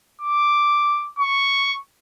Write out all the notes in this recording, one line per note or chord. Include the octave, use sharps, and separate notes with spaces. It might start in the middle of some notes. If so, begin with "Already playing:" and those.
D6
C#6